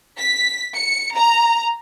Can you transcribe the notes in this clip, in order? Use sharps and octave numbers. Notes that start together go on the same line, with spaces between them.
B6
C#7
A#5